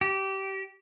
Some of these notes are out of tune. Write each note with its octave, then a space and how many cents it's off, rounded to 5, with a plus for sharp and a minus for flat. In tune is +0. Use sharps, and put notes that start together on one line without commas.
G4 -20